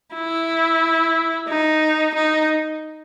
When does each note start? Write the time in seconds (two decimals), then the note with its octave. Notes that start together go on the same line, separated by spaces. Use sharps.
0.15 E4
1.49 D#4
2.15 D#4